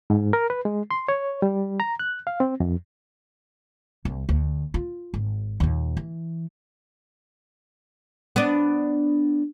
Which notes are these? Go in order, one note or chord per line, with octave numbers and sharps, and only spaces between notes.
G#2
A#4
B4
G#3
C6
C#5
G3
A#5
F#6
F5
C4
F2
C2
D2
F4
G#1
D#2 A#2
E3
B3 D4